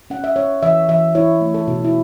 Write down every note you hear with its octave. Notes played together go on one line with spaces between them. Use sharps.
C#4 F#5
E5
C#4 C#5
E3 E5
E3 E5
E4 C#5
A3
A4
B2
E4